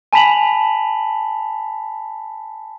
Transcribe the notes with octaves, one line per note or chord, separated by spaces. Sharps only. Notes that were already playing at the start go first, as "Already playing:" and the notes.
G#5 A5 B5 B6 F7 F#7